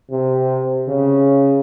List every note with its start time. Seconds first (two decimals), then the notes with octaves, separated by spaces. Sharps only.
0.10 C3
0.88 C#3